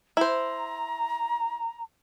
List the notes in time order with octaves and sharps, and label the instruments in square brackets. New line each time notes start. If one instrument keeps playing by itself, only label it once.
[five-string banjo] E4 C5 [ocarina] A#5